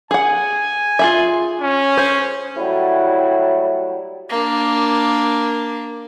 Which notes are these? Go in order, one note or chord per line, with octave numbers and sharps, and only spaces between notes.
G#4 F#5 G#5
F4 G#4 E5
C#4
G#4 C5
A2 F#3 G3 E4 F#4
A#3 D4